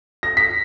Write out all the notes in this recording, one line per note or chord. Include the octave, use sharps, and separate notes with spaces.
A#6
B6